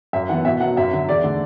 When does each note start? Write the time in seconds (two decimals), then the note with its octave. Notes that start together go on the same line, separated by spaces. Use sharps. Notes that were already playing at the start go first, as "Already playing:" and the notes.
0.13 F#2 E5
0.29 E3 B3 F#5
0.45 B2 E5
0.60 F#3 B3 F#5
0.77 F#2 E5
0.92 D3 F#3
1.09 E2 D5
1.24 D3 A3